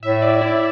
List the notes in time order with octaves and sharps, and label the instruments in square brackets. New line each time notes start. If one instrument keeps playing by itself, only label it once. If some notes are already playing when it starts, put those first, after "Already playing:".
[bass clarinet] A2 [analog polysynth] E5
[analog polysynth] D5
E4